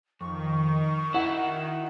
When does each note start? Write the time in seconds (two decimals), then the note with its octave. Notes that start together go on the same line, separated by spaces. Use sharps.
0.21 F2 D#3 C#6
1.14 E4 F#4 F#5